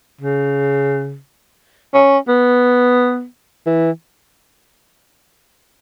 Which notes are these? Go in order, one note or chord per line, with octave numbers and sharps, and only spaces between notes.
C#3
C#4
B3
E3